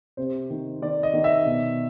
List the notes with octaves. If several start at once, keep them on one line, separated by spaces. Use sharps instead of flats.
C3 C5
D#3
D#3 D5
D#5
D#3
E5
B2